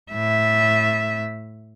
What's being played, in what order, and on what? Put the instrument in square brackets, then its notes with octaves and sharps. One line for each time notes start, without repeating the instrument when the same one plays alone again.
[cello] A2 E5